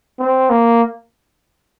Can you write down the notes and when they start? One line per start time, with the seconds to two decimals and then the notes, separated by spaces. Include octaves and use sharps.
0.19 C4
0.50 A#3